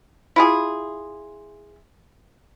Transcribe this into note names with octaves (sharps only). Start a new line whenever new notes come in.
E4 F4 G#4